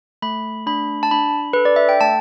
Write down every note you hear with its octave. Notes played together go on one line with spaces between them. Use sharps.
A3 B5
D4 B5
A5
D4 B5
A4 B4
D5
E5
G5
A3 A5